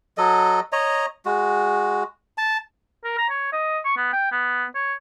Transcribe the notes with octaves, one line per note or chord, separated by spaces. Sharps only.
F#3 A4 D#5
C#5 D#5 A#5
G#3 F#4
A5
A#4
A#5
C#5
D#5
C#6
B3
G5
B3
C#5